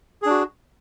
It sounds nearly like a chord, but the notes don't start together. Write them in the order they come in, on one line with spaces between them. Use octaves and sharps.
G#4 D4 F#4